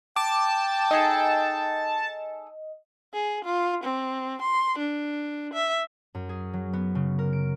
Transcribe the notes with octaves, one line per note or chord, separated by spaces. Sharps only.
G5 A5 D6
D#4 G#4 A4 D#5
G#4
F4
C4
C6
D4
E5
F#2
G#4
F#3
B3
C#3
A#4
D7